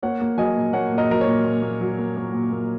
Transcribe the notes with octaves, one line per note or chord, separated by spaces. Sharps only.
A#3 C#5 F#5
A#3
F#3 D#5 G#5
A#2
A#3 C#5 F#5
A#2
A#4 D#5
F#3 A#4
C#5
A#2
A#2
A#3
F#3
A#3
A#3
A#2
A#3